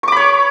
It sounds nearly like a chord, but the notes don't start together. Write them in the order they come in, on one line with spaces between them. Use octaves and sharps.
C#6 D6 B5 C#5